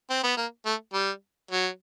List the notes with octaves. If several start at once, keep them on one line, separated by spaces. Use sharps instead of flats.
C4
B3
A#3
A3
G3
F#3